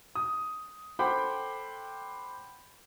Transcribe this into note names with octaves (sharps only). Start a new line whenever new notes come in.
D#6
A4 C5 F#5 G5 B5 D6